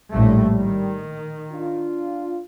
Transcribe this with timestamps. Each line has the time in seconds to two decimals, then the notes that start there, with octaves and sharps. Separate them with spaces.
0.12 A#1 A2 G3 A3
0.60 D#3
1.52 D4 F4